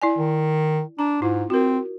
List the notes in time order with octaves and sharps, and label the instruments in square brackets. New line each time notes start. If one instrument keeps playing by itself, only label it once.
[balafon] E4 D5 G#5
[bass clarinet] D#3
[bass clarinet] D4 [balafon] A#5
[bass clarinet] G#2 [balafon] E4 F4
[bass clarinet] C4 [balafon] F#4 A#4